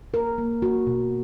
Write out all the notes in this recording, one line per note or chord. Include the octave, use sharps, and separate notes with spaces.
A#3 A#4
A#3
A#3 F#4
B2